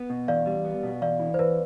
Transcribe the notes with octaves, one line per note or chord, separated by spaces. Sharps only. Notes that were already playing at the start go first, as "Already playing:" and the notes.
Already playing: B3
B2
E2 D5 F5
G3
B3
B2
E2 D5 F5
E3
C5
E2 B4